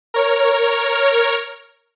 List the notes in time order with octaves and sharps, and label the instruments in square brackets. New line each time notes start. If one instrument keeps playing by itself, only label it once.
[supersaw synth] A#4 C#5 F6